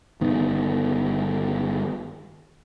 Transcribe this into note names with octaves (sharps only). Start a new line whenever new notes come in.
G1 D#3 B3